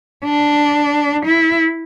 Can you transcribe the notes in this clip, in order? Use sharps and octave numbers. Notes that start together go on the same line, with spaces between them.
D4
E4